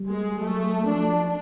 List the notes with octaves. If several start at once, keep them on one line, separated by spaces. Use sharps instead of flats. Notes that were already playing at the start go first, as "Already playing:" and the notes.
Already playing: G3
G#3
F#3 A3
F3 D4